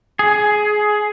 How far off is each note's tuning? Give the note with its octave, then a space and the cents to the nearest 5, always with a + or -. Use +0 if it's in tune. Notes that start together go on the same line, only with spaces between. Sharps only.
G#4 +15